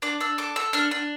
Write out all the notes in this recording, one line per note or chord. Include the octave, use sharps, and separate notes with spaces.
D4 D6
D4 E6
A4 D6
A4 E6
D4 F6
D4